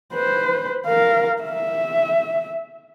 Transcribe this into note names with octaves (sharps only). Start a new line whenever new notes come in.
B4 C5
A#4 F5
E5